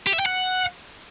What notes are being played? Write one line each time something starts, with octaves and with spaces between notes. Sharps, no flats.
G4
E5
G5
F#5